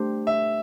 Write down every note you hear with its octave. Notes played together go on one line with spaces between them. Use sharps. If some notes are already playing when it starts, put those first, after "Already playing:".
Already playing: A3 D4 G4 C5
E5